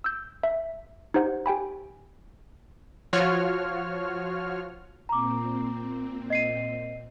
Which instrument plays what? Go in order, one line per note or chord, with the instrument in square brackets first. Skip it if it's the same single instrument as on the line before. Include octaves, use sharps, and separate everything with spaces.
[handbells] E6 G6
E5
D#4 G4 C5 F#5
G4 G5 G#5 B5
[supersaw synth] F3 F4 F#4 C#5 F6
[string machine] A#2 C4 [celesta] A#5 D6
[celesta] D#5 C7 D#7